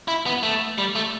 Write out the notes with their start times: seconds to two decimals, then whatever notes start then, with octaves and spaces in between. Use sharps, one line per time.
0.08 E4
0.26 B3
0.43 A3
0.78 G3
0.96 A3